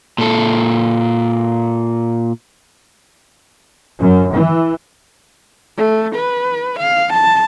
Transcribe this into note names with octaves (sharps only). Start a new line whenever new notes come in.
A#2 A4
F#2
E3
A3
B4
F5
A5